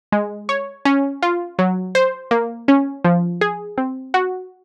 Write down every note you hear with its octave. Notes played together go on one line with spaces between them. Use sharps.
G#3
C#5
C#4
F4
F#3
C5
A#3
C#4
F3
G#4
C4
F#4